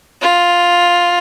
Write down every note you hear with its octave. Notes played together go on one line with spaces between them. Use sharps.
F4